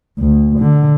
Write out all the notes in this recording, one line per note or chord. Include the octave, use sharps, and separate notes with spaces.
D2
D3